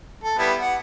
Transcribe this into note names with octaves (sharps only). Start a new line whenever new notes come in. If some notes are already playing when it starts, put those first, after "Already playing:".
A4
G3 B3 E4
F#5